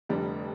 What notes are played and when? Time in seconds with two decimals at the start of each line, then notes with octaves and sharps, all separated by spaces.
0.09 F1 F2 D3 G3 D4